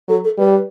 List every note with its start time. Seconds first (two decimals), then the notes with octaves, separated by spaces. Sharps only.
0.08 F#3 A4
0.24 A4
0.38 G3 B4